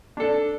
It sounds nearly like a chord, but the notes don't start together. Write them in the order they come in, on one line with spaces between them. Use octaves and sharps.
D4 A4 D5